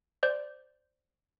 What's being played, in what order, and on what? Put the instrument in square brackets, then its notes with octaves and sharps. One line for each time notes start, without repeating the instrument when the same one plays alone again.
[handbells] C5 D5 G6